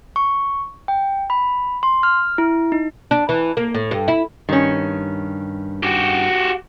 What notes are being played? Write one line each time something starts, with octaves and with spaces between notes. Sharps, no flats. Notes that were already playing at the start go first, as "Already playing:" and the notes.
C#6
G5
B5
C6
F6
E4
D#4
D4
E3
A#3
A2
G2
E4
G2 D#3 C#4
F#4 G4